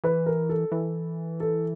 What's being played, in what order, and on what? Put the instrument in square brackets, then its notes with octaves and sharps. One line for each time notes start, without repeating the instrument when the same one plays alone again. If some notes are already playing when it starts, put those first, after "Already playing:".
[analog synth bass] E3 [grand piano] B4
[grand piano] A#4
A4
[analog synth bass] E3
[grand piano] A4